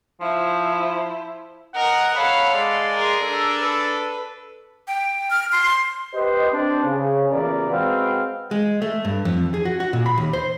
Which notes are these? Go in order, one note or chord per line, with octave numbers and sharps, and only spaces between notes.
F3 E4 C5
A#4 D#5 F#5
A4 C#5 F5 F#5 B5
G#3 D5 C6
G#4 A#4
D4 A4
B4
G5
F6
C6
G4 B4 C5 D#5
C4 D4 C5
C#3
A1 E2 A#2 A#4 D5
G#3 C4 F#4 B4 F5
G#3
A3
G2
F2
G#4
F#4
F#4
A#2
B5
D#2
C5